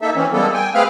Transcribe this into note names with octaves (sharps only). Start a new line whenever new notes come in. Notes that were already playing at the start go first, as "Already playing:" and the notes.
A#3 D#4 A4 E5
E3 C4 C#4
G3 G#3 A#3 B3 A4
G5 G#5
A3 C4 G#4 B4 F5 F6